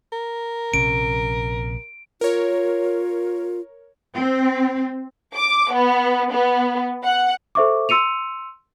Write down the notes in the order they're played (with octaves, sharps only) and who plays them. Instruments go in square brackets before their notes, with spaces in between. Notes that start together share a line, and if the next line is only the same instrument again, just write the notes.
[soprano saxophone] A#4
[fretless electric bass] A#1 C3 C#4 [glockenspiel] D7
[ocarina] F4 [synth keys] A#4 C#5
[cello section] C4
[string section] D6
B3
B3
F#5
[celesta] A4 C5 E5 C#6 D6
C6 E6 C#7 D#7 F7